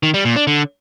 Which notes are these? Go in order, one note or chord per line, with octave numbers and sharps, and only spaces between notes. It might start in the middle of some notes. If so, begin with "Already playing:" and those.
D#3
G3
A#2
D4
D3